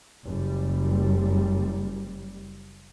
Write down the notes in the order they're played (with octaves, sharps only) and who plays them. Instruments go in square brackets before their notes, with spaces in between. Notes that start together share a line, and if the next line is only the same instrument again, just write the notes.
[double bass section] F#1 G3